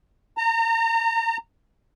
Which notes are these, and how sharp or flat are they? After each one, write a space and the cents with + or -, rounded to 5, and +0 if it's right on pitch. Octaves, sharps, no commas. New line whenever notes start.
A#5 -35